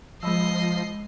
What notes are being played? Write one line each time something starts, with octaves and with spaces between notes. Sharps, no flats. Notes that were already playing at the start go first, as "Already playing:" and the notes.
F3 G#3 D#5 B5 E6 C7